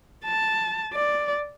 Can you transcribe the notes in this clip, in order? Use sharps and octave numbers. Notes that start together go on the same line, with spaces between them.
A5
D5